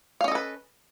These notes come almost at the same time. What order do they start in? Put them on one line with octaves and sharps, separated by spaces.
F5 C#4 D#5 A4 B4